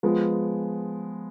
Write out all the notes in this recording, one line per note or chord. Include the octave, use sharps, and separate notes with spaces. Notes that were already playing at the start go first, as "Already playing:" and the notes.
F3 G#3 B3